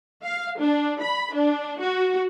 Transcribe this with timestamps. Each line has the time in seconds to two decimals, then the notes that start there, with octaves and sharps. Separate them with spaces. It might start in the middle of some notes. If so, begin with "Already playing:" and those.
0.23 F5
0.59 D4
1.03 B5
1.35 D4
1.81 F#4